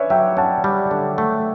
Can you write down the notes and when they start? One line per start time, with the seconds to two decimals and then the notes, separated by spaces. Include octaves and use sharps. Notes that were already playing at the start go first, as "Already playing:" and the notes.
Already playing: C#4 B4 C#5 D5 E5
0.10 F#3 E5 G5
0.37 C#4 F#5 A5
0.64 G3
0.91 D3
1.18 A3